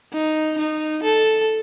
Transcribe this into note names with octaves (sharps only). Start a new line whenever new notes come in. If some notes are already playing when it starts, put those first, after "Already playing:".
D#4
D#4
A4